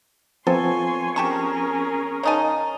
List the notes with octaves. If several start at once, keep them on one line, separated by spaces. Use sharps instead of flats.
F3 B3 C4 A4 C#5 G#5 C6
C#4 G4 G#4 A#4 A5 C#6
C#3 D#4 C#5 G#5 A5